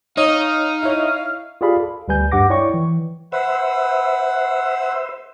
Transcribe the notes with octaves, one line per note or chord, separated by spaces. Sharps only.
D#4 C#5 D#5 F5
E4 C#5
F4 G4 G#4 D5 F5 B5
A4
D2 G3 B4 G#5 G6
G2 G4 F#5 D6 A#6
E4 C#5 D5 G5 C#6
E3
B4 C5 E5 F#5